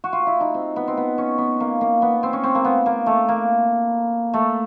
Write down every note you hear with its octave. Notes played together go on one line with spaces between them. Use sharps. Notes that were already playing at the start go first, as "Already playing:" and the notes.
F#4
F4
E4
D#4
C4
B3
C4
B3
C#4
B3
A#3
A#3
B3
C4
C#4
C4
A#3
B3
A#3
A3
A#3
A3